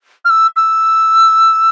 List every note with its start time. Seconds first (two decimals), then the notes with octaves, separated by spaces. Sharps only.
0.24 F6
0.29 E6
0.56 E6